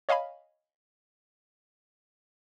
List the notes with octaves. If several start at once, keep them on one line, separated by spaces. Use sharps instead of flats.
C#5 D#5 F5 G#5 B5